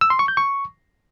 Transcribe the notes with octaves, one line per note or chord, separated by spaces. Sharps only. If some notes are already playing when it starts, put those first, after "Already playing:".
E6
C6
C#6
G6
C#6